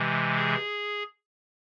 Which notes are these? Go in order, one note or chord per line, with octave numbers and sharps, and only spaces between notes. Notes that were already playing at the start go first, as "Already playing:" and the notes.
Already playing: C3 E3 G#3
G#4